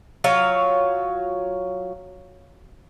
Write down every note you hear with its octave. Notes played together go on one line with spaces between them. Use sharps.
F#3 F4 C#5 F5